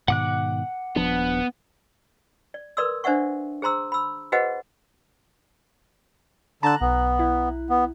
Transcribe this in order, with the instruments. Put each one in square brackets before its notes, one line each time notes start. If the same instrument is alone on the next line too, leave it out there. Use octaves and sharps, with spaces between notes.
[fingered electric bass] G#2 B2 D#3 [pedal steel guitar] F#5 D6 F#6
[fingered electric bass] D#1 F3 D4 [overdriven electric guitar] B3
[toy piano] D5
A#4 B4 D5 C6 D#6 E6
D4 C5 D5 E5 F#5 C#6
G#4 C5 A#5 C6 E6
B5 E6
F#4 G#4 B4 C5 D#5 F#5
[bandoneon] D3 A5 [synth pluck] A#5 F#6
[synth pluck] B1 [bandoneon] B3
[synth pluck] E4
[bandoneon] B3